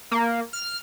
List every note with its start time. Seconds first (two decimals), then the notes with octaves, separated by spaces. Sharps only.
0.11 A#3
0.53 F6